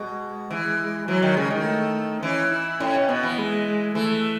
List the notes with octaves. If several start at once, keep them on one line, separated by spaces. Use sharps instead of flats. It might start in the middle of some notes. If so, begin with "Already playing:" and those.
Already playing: B2 G#3
E3 G#3
E3 F#3
D#3
C#3 G#3
D#3
A3
E3 C#4
E4
A2 C#4
B2
B2 B3
E3
G#3
E3 A3